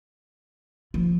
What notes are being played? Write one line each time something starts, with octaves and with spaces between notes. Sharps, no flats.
F3